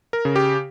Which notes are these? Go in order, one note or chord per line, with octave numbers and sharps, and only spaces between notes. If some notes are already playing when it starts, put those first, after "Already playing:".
A#4
C#3
G4